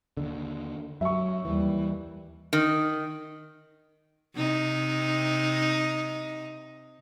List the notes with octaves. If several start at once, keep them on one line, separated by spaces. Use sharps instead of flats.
D#2 D3
F#2 F#3 E5 C#6
D#2 E3 G3
D#3
C3 D#4